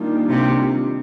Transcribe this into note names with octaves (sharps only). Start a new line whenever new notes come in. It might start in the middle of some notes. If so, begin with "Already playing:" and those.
Already playing: D#3 G3 A#3 D4 F4
C3